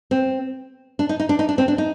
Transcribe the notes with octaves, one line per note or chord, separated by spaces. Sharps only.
C4
D4
D#4
D#4
D4
D#4
D4
C4
D4
D#4